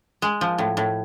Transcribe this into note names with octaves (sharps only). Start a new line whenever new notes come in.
G#3
F3
A2
A2